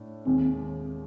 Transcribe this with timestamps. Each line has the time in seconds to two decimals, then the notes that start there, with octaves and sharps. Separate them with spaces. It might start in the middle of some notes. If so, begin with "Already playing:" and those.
Already playing: A2 D4
0.26 D#2 D#3 G#3 C4